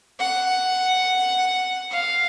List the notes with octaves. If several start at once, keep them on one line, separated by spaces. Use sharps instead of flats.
F#5
F5